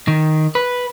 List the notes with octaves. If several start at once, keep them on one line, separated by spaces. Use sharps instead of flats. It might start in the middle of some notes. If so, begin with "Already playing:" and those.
D#3
B4